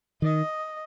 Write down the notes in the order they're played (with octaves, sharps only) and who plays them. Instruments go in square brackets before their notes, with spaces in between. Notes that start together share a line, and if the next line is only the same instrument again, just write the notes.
[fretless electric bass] D#3 [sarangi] D#5